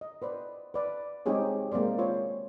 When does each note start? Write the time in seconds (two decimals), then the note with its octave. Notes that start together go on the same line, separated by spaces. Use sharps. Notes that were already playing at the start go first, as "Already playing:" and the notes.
0.01 D#5
0.22 B4 C5 D5
0.74 B4 D5
1.26 G#3 C4 D#4 G4 G#4 C#5
1.72 G#3 A#3 C4 C5 D5
1.98 F4 C5 C#5